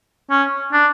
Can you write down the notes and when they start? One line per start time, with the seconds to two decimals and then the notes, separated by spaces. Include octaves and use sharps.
0.30 C#4
0.73 D4